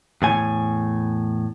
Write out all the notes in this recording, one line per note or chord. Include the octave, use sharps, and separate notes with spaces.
E2 A2 G#5